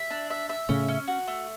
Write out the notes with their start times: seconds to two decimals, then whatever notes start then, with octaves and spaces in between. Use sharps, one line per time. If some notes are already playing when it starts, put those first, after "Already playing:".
Already playing: E5
0.10 D4
0.30 E5
0.49 E5
0.69 A2 C#3 C#4
0.88 C#4
1.08 F#4
1.28 A3